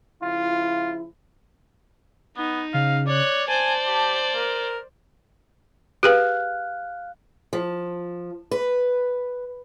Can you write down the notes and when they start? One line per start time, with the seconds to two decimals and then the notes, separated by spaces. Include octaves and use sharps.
0.22 C#3 F3 E4 F4
2.37 B3 D#4
2.74 C#3 F5
3.07 C#5 D5 F#6
3.48 C5 D5 G#5 A5
3.87 G4
4.35 A#4
6.03 G4 G#4 B4 F5 F6 F#6
7.53 F3
8.51 B4